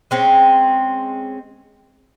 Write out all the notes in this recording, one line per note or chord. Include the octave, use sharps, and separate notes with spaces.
G#3 C4 C#4